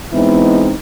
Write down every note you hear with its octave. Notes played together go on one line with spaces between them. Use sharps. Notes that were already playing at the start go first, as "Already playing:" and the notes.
E3 G#3 B3 C4 D#4 E4